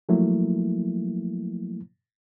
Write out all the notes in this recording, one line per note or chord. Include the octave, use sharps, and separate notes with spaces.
F3 F#3 A3 A#3 E4